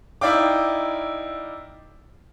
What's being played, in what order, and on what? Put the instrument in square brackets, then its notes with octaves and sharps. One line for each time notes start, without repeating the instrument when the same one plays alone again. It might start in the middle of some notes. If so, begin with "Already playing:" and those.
[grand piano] D#4 E4 D5 F5 G5 D6